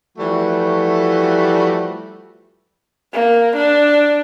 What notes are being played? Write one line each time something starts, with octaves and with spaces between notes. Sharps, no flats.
E3 F3 G3 A3 F#4
A#3
D4